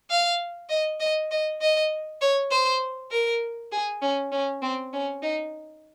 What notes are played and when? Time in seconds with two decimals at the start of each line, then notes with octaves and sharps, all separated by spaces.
0.10 F5
0.70 D#5
1.00 D#5
1.31 D#5
1.61 D#5
2.21 C#5
2.51 C5
3.11 A#4
3.72 G#4
4.02 C#4
4.32 C#4
4.62 C4
4.93 C#4
5.22 D#4